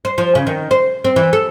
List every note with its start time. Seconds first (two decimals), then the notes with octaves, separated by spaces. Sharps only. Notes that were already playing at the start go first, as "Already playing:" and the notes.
0.05 C5
0.18 F3
0.35 C#3
0.47 D#3
0.71 C5
1.04 C4
1.16 E3
1.33 A4